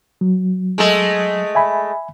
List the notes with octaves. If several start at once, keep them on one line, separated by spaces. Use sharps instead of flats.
F#3
G#3 A3 A4
E5 G#5 B5